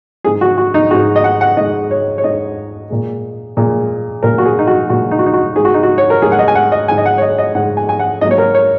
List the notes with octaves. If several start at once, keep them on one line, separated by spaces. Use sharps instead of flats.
G#2 G#3 G#4
F#4
F#4
D#4
G#2 G#3 F#4
D#5
F#5
F#5
G#2 G#3 D#5
C#5
C#5
G#2 G#3 D#5
A#2 G#3
A#2 G#3
A#2 G#3 A#4
F#4
G#4
D#4
F#4
A#2 G#3 F#4
D#4
F#4
D#4
F#4
G#2 G#3 G#4
F#4
D#4
F#4
C#5
A#4
G#2 G#3 G#4
F#5
D#5
G#5
F#5
D#5
G#2 G#3 G#5
D#5
F#5
C#5
D#5
D#5
G#2 G#3 F#5
G#5
G#5
F#5
G#2 F#3 A#3 D#5
C#5
A#4
C#5